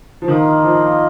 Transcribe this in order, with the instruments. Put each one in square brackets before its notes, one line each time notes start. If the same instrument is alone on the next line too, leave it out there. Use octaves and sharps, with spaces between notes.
[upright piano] F3
[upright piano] D#3 [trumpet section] A#3 F4 A#4 D#5
[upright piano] F3